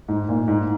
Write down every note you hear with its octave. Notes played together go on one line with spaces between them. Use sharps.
G#2
A#2
G#2